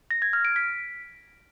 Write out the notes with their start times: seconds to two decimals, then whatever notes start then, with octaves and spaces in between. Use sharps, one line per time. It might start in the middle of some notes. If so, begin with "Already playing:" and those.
0.11 A#6
0.22 G#6
0.33 F6
0.45 D7
0.56 B6